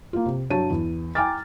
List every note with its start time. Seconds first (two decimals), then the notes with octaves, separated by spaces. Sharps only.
0.13 A#3 F4
0.26 C3
0.50 G2 F#3 C#5 A5 D#7
0.70 E2
1.15 G5 G#5 A#5 D6 F6 A6